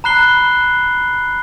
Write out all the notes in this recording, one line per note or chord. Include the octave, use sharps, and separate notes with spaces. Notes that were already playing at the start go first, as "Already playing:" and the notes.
A#5 B5 F#6 C7 G7